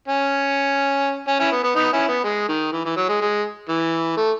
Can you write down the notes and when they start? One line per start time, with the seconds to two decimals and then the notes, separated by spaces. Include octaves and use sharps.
0.08 C#4
1.28 C#4
1.39 C#4 E4
1.52 B3
1.63 B3
1.76 B3 D#4
1.93 C#4 E4
2.09 B3
2.24 G#3
2.48 D#3
2.72 E3
2.85 E3
2.96 F#3
3.09 G#3
3.21 G#3
3.69 E3
4.17 A3